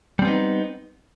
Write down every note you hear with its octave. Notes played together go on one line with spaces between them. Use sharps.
G3 B3 C4 D#4